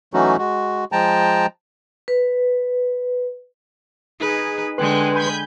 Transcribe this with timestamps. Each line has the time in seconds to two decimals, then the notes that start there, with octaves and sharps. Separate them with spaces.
0.14 E3 F#3 A3 C#4 D#4 F#4
0.38 G#3 F#4
0.92 F3 G#3 G5 A5 A#5
2.08 B4
4.20 D#4 G#4 B4
4.78 D3 G#3 B4 G5 G#5 C6 F#6
5.15 G#5 B5 G6